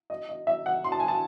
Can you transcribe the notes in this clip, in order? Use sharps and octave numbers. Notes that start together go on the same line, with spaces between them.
D#5
D#5
E5
F#5
C6
A5
G#5
A5